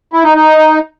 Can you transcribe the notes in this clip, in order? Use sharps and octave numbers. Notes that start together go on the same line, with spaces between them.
E4
D#4
D#4